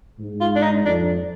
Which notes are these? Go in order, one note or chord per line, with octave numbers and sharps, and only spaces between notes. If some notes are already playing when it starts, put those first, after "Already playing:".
G#2
F4
D4
D#4
F2 D4